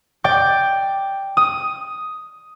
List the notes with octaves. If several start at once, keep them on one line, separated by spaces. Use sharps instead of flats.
D5 G5 D6 G6
D#6